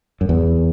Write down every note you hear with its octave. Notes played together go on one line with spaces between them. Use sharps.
F#2
E2